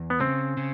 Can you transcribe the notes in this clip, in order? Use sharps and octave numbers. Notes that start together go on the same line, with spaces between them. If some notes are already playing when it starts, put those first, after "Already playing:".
Already playing: E2
B3
C#3 C4
C#3